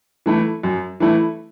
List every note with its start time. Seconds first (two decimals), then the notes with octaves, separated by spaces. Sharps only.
0.26 E3 A3 E4
0.63 F#2
1.00 E3 A3 E4